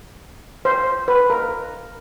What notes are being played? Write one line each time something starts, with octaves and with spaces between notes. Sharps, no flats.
C5
B4
A#4